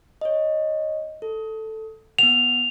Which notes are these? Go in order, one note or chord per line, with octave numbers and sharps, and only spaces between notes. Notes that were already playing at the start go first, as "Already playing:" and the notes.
C#5 D#5
A4
B3 F#5 F7